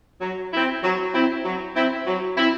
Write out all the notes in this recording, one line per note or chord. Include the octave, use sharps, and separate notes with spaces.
F#3
C4 E4
F#3
C4 E4
F#3
C4 E4
F#3
C4 E4